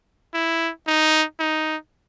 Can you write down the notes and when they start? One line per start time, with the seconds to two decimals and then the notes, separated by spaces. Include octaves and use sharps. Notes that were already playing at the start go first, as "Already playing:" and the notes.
0.34 E4
0.87 D#4
1.40 D#4